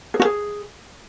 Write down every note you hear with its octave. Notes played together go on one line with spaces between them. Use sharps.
G#4
F#4
G#4